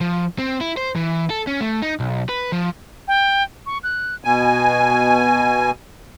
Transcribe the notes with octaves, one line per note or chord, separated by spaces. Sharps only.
F3
C4
E4
C5
E3
A4
C#4
A3
D#4
B1
B4
F3
G5
C#6
F#6
B2 G#5